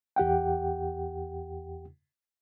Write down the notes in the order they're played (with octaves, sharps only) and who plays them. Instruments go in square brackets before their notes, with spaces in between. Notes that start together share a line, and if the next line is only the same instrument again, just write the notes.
[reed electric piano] E2 G4 F#5 G5